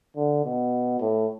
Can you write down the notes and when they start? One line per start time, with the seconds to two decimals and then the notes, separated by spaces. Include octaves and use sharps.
0.16 D3
0.45 B2
1.00 A2